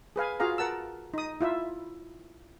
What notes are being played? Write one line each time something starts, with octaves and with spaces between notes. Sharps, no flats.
G#4 B4 F5 G#5
F4 F#4 G#4 F5 A#5
A#4 F#5 A5 E6
D#4 D#6
E4 F4 E5